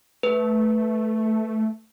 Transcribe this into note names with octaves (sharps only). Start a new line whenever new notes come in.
A3 B4